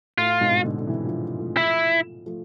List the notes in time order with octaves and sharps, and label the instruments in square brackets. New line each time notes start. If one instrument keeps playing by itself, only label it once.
[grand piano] A2 [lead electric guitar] F4
[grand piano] G#2 B2
B2 D3
D3
C3 E3
D3 F3
F3 A3
[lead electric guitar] E4
[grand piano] F3 A3